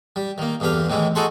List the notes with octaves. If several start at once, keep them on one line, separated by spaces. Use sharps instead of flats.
G3
D#3 A#3
E2 G2 D3 G4 F5
A2 D#3 E3 G#3
D#4 F#4 G#4 A4 F#5 C6